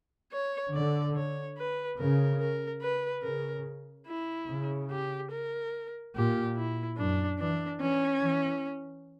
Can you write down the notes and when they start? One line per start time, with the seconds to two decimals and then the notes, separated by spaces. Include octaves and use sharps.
0.32 C#5
0.74 D3 D5
1.16 C#5
1.58 B4
1.98 C#3 A#4
2.40 A#4
2.81 B4
3.23 C#3 A#4
4.07 E4
4.48 C#3
4.91 G4
5.31 A#4
6.15 A#2 G4
6.56 E4
6.97 F#2 D4
7.39 E3 D4
7.80 E3 C#4
8.22 E3